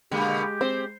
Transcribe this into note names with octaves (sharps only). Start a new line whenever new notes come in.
B2 D3 G#3 A#3 G4
C4 C5